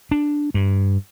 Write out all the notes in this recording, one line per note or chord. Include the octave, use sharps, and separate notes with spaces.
D4
G2